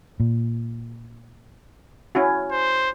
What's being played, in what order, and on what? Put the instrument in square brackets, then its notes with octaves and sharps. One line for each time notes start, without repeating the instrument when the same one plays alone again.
[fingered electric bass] A#2
[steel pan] C#4 E4 F#4
[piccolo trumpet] C5